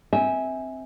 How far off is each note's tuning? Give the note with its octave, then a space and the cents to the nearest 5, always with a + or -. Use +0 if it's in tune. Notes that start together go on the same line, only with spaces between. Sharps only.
C4 +0 E5 -25 G#5 +0